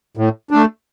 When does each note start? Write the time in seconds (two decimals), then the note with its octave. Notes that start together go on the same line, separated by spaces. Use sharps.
0.17 A2
0.51 A3 D4